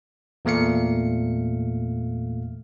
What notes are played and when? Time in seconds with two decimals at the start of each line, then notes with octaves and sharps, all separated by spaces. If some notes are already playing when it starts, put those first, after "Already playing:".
0.45 E2 A#2 A3 F5 C#7